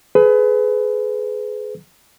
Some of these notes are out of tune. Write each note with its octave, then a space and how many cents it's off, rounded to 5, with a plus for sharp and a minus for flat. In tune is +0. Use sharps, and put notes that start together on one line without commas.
G#4 +30 B4 +25